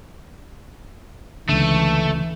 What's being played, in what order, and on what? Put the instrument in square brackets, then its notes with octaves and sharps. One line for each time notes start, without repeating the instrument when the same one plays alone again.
[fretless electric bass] C#2 D3 [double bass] E3 [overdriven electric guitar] A3